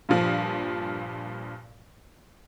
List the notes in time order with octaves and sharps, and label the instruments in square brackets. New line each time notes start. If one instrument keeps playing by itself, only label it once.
[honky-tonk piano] G2 A#2 F3